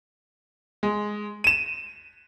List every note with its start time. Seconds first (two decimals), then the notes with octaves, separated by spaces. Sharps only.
0.83 G#3
1.44 D#7 E7